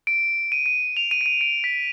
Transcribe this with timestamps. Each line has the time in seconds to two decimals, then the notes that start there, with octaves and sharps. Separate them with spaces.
0.07 D7
0.52 D#7
0.66 D#7
0.97 F7
1.11 D#7
1.21 D7
1.26 D#7
1.41 D7
1.64 B6